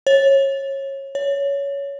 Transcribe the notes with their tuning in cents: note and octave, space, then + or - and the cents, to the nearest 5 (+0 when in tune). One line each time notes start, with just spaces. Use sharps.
C#5 -25
C#5 +15